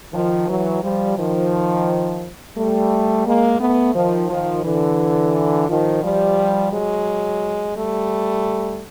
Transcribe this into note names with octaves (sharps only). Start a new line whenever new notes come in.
D#3 F3
E3 F#3
F3 G3
D#3 F3
G3 A3
G#3 A#3
A3 B3
D#3 F3
D#3 F3
D3 E3
D#3 F3
F3 G3
F#3 G#3
G3 A3